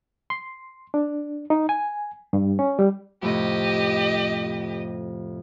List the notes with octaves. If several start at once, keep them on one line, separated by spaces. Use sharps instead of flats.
C6
D4
D#4
G#5
G2
C#4
G3
F2 A2 C3 G4 D#5